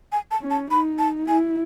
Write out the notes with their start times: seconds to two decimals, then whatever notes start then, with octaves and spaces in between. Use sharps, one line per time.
0.12 G#5
0.31 A5
0.41 C#4
0.50 A5
0.71 D#4 B5
0.99 A5
1.28 E4 G#5